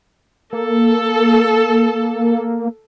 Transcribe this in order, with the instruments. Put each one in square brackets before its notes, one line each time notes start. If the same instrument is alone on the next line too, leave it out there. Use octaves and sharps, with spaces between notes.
[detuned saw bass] A#3 [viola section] A4